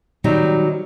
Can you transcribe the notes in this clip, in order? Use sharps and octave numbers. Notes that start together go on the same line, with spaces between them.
D#3 F#3 G3 C4 D#4